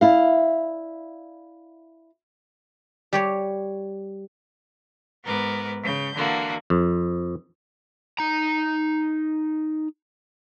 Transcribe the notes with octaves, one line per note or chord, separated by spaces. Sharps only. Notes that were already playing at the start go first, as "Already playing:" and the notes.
E4 D5 F5
G3 G4 C#5
G#2 B3 A#4 B4 D6
C#3 G6
D3 E3 A#3 F#4
F2
D#4 A#5